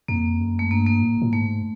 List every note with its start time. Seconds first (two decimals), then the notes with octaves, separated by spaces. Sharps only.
0.08 F2 A#3
0.40 F#2
0.59 A3
0.70 G2 A#3
0.86 A#3
1.02 A2
1.22 A2
1.33 G#2 A3